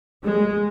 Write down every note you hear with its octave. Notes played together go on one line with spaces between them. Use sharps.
G#3